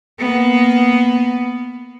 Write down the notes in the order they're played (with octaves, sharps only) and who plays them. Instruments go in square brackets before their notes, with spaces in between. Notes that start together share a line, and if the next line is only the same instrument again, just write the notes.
[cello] A#3 B3